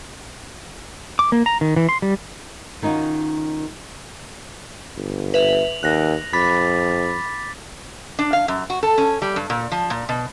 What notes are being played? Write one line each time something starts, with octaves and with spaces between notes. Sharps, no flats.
D6
A#3
A#5
D#3
E3
C6
G3
D#3 C#4 D#4 F4 F#4
G1
B4 E5 F7 F#7
D#2 F#6 A#6
F2 B5 D6 A6 B6
D4
F5
F#2
F#4
A4
C#4
G3
G2
A#2
F3
A#2
B2